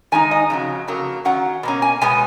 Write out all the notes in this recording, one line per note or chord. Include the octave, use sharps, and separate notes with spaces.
D#3 G#3 D#4 G#5
D#5
F2 C#3 F#3
F2 C#3 F#3 A#3
D#3 F#3 C#4 F#5
B2 A#3 C#4
G#5
B2 G#3 B3 G#5